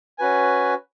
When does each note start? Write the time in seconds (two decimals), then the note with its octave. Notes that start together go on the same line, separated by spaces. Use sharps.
0.19 C#4 F#4 B4 G#5